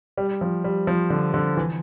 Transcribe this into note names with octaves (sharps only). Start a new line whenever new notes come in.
G3
F3
G3
F3
D3
D3
E3